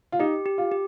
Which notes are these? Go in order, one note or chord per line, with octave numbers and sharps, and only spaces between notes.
F4
D#4 G4
G4
F4
G4